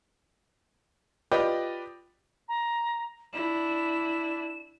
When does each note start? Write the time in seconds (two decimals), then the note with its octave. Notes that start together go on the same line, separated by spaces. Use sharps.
1.31 F4 G4 B4 D5 D#5
2.48 A#5
3.33 D4 E4 E7